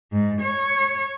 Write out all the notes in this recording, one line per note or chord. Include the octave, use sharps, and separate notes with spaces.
G#2
C#5